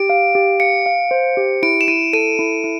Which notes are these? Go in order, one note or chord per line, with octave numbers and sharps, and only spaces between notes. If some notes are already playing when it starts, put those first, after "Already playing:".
Already playing: G4 D7
F5
G4
F5 C#7
F5
C5
G4
E4 D7
E7
E4 D#7
A4 D#7
E4
E4